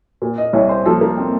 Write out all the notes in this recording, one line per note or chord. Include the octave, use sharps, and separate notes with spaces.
A#2
D#5
C2 C#5
C5
F3 A4
A#3
C4